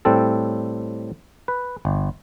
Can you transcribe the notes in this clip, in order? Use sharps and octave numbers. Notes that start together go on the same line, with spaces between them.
A2 G3 C4 A4
B4
G1